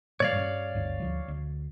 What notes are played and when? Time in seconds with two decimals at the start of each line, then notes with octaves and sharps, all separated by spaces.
0.20 A#2 E3 G3 C#5 D5 F5
0.32 G2 G3 C#4
0.75 G1 D2 G2
1.00 D2 F3 G3
1.28 D2